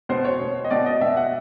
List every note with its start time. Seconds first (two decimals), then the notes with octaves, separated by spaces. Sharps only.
0.09 B2 C5
0.25 C#5
0.40 B2
0.64 D#5
0.70 B2 D5
0.86 D#5
1.01 B2 E5
1.17 F#5